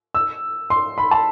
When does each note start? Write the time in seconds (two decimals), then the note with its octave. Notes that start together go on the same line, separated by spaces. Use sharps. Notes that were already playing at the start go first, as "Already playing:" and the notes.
0.15 E6
0.70 C6
0.98 B5
1.11 A5